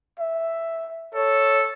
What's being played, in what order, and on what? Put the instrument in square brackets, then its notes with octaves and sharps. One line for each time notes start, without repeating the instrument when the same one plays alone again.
[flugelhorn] E5
[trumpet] A4 [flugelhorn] C#5